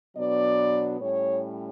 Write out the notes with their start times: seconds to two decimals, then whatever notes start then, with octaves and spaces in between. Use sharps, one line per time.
0.16 B2 F#3 B3 D4 D5
1.01 A2 G3 C#4 C#5